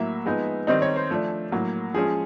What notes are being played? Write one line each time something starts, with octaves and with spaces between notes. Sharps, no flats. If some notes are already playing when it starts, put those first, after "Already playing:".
Already playing: A2 F#3 A#3 E5
F3 G#3 B3 D#4
D#3 G3 C4 D#4 D#5
C#5
C5
F3 A3 D4
A2 F#3 A#3
F3 G#3 C#4 G#4